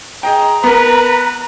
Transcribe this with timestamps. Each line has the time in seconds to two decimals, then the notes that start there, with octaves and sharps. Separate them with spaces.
0.23 G#4 D#5 G5 A#5
0.64 B3 A#4 B4